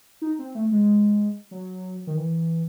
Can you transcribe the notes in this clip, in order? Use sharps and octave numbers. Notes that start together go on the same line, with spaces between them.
D#4
C4
A3
G#3
F#3
D#3
E3